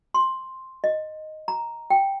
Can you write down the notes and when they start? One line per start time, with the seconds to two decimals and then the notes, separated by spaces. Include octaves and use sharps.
0.14 C6
0.84 D#5
1.48 A#5
1.90 G5